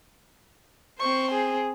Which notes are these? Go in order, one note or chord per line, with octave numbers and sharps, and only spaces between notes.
C4 C5 C#6
G#4